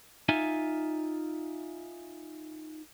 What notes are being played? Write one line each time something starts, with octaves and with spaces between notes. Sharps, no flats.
D#4 F4 E5 G#5